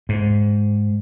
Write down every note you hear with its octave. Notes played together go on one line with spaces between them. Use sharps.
G#2